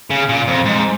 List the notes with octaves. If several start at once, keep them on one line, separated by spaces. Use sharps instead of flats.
C#3
A#2
F2
G#2